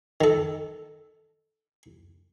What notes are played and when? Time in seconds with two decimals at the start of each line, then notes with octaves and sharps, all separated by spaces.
0.21 D#3 A4